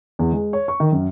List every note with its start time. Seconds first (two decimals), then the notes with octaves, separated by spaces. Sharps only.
0.19 E2
0.32 G#3
0.53 C#5
0.68 C#6
0.80 D#3
0.92 F#2